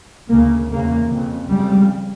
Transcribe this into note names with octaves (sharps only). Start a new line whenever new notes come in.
D2 C#3 A#3
E2 C#3 A#3
F2 C#3
F2 C#3 G3